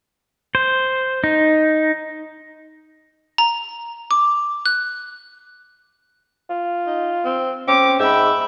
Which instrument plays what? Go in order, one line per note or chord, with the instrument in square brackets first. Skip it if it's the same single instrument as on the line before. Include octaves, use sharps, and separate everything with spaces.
[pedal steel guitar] C5
D#4
[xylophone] A#5
D6
F#6
[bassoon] F4
[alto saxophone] D#4
C4
[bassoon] C4 [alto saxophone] C#4 [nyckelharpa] D6
[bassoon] G#2 [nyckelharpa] E5 B5 [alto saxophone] G5